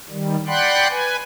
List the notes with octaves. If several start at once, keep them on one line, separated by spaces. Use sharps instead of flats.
D#3 G3
D5 F#5 G5 B5 C6 F#6
B4 G#5